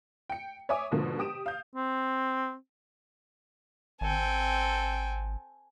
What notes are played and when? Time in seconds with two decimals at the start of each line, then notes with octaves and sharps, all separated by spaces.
0.30 G5 C#7
0.69 C#5 E5 G#5 D6 D#6
0.92 G#2 B2 D3 F3 A#3
1.19 G4 D#6 D7 E7
1.46 F5 G6
1.75 C4
4.01 G#1 C4 A4 G5 G#5